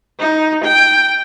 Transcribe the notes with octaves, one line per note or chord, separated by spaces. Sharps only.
D#4
G5